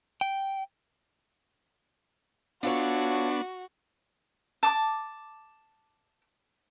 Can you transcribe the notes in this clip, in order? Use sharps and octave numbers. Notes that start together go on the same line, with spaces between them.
G5
B3 D4 F4 F#4 A4 C#5
A5 D6